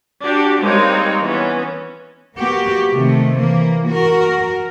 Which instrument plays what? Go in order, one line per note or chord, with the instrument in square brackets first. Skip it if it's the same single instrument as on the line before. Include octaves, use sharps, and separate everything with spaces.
[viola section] D4 F#4 G4
G3 G#3 A#3 C4 D#4 C#5
E3 B3 C#4
[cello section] A#3 B3 F#4 G4
C3 D#3 A3
E3 A#3
F#4 A#4